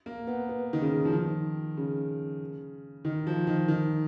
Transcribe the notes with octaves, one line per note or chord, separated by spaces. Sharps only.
A#3
B3
B3
D#3
C#3
F3
D#3
C#3
D#3
F3
D#3
D#3